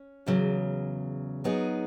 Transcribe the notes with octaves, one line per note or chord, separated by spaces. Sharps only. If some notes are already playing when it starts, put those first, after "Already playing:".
Already playing: C#4
E2 C#3 F#3
F#3 B3 D#4 G#4